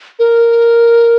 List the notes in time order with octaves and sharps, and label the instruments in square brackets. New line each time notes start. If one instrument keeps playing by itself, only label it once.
[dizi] A#4